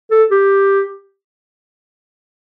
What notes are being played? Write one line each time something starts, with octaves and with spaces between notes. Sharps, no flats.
A4
G4